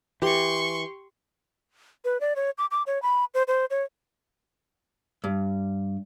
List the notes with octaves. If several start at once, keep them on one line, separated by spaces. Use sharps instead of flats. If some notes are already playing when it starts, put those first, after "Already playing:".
E3 G4 C6 C#6
B4
D5
C#5
D6
D6
C#5
B5
C5
C5
C#5
G2